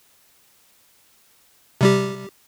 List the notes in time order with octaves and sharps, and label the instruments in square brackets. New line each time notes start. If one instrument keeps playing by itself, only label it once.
[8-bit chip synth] C3 G3 G4